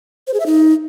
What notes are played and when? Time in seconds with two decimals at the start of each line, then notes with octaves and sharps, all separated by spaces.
0.27 C5
0.34 G#4
0.40 E5
0.46 D#4